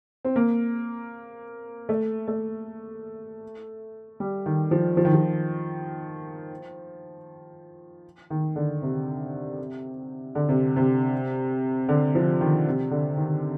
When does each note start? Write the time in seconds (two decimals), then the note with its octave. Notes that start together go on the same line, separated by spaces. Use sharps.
0.25 C4
0.36 A#3
1.89 A3
2.28 A3
4.20 G3
4.46 D#3
4.71 F3
4.97 F3
5.05 D#3
5.13 F3
8.30 D#3
8.56 D3
8.82 C3
10.35 D3
10.49 C3
10.76 C3
11.89 D3
12.15 F3
12.41 D#3
12.67 C3
12.91 D3
13.17 D#3